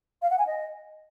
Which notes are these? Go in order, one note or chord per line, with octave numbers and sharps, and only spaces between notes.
F5
F#5
G#5
D#5